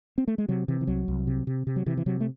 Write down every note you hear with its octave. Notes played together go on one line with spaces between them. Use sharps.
C4
A3
G#3
C3 F#3
C3 E3
E3
C2 F#3
C2
C3
C3
C3
F#3
C3 E3
E3
C3 F#3
A3